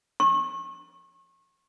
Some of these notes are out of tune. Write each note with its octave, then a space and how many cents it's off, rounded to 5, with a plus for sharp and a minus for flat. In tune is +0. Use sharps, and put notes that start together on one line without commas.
C#6 -35